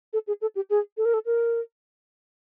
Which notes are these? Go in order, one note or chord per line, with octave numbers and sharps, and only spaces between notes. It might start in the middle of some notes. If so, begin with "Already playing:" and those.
A4
G#4
A4
G4
G#4
A4
A#4
A4
A#4